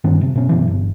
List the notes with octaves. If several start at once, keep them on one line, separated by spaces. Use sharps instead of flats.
G2 D#3 B3 C#4
C3
B2 C#4
F#2 B2 E3
G1